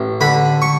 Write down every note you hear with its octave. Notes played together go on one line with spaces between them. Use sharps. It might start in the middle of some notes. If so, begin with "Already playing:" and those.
Already playing: A1
D3 B5
C#6